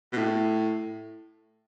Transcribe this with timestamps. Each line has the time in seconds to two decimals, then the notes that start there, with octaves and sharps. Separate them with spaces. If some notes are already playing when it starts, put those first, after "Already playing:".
0.12 B2
0.17 A2